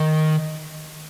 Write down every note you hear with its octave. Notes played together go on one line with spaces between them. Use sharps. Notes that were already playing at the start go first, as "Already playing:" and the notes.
Already playing: D#3